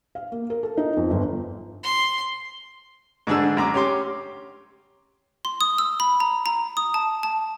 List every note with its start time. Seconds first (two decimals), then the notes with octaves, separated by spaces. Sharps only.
0.15 F5
0.32 A#3
0.50 A#4
0.63 A4
0.77 D#4
0.97 F2
1.10 G1
1.83 C6
3.27 G#2 D3 D4 G#4 E6
3.57 F#2 A#5 D6
3.74 C#4 G4 C6 D6
5.45 C6
5.61 D#6
5.78 E6
6.00 B5
6.20 A#5
6.46 A#5
6.77 D#6
6.94 A5
7.23 A5